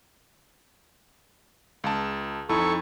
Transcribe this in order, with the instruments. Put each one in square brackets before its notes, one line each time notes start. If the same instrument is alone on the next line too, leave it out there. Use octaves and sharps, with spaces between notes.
[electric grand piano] C#2 A5
[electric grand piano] F2 [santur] D#4 E4 [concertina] A4 C#6